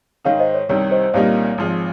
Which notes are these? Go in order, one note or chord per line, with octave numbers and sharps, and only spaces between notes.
G#2 D#3 G#3 D#4 C#5 F5
C5 D#5
C#5
C2 C3 D#3 G3 C#5
C5 D#5
C2 A#2 G3 A#3 D#4 C#5 F5
G#1 G#2 F3